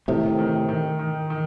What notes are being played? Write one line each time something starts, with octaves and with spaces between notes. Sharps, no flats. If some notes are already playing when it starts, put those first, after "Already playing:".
A2 C3 D#3
D#3
D#3
D#3
D#3